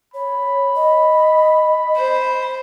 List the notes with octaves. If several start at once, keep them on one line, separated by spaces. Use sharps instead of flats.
C#5 B5
D#5
C5